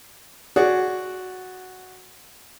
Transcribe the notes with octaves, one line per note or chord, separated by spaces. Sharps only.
F#4 G#4 D5